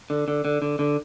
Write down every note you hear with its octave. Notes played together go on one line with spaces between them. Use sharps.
D3
D3
D3
D3
D3